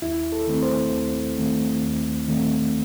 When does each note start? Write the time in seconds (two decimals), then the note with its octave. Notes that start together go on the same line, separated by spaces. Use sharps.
0.02 D#2 E4
0.32 A4
0.47 D#3 A3 C4
0.63 C5
0.92 D#2
1.38 D#3 A3 C4
1.83 D#2
2.28 D#3 A3 C4